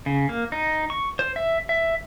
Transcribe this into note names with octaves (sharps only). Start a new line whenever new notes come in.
C#3
A#3
D#4
C#6
C5
E5
E5